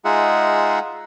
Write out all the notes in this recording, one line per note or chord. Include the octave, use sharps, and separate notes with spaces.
G#3 D#4 F4 G#4 E5 F#5